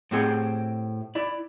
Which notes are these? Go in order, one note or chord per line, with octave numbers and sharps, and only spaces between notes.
A2 A3 C4 G4 G#4 F#5
E4 D5